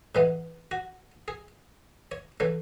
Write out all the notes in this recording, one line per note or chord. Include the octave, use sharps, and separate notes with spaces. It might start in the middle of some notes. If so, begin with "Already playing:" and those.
A2 E3 G#3 B3
F#4
G#4
C#5
C#3 E3 A3 C#5